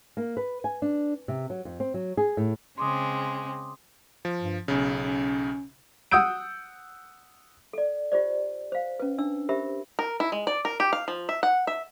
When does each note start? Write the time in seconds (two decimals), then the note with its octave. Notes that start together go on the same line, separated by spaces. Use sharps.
0.17 A#3
0.37 B4
0.64 G#5
0.82 D4
1.28 C3
1.50 F#3
1.65 F2
1.80 C4
1.94 F#3
2.17 G#4
2.37 A2
2.78 C#3 G#3 C4 C6 D6 D#6
4.25 F3
4.41 G2
4.68 B1 C#3 C#4
5.01 C#4
6.11 F#5 D#6 E6 G6 D7
7.73 A4 D5
8.12 F4 G4 C5 D5
8.72 C5 F5
9.00 C#4 B4
9.18 D4 D#4 E6
9.49 G4 A#4 C5 E5 B5
9.99 A#4
10.20 E4
10.32 G#3
10.47 D5
10.65 A#4
10.80 G4
10.93 F5
11.08 F3
11.29 E5
11.43 F#5
11.67 E5